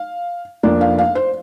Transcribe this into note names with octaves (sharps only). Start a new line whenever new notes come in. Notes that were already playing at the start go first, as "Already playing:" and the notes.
Already playing: F5
F1 F2 F3 A#3 D4
F5
F5
C5